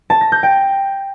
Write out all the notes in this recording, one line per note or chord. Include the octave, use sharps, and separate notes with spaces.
A5
A#6
G6
G5